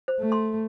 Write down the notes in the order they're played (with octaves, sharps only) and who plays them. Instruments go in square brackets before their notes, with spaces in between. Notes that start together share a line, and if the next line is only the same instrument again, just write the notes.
[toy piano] C5
[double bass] A3
[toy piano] C6